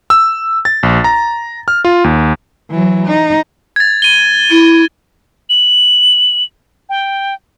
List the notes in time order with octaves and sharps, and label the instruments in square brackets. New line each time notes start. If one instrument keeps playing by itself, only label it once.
[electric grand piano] E6
A6
A#1
A#5
F6
F4
D#2
[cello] E3 F#3
D#4
[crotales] G#6 A6
D#7 G7
[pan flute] E4
[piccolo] F#7
G5